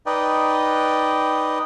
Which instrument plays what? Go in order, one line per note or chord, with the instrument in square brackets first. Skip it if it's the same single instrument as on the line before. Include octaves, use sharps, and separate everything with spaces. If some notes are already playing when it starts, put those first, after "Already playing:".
[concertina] D#4 B4 D5 D#5 G5